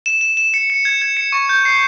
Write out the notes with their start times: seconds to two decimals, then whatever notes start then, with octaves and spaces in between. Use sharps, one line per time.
0.06 E7
0.21 E7
0.37 E7
0.54 C#7
0.70 C#7
0.85 G#6
1.02 G#6
1.17 C#7
1.32 C#6
1.49 G6
1.65 C7